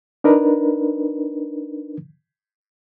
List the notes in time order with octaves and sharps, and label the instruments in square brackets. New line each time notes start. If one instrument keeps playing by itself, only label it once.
[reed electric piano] D4 D#4 A#4 B4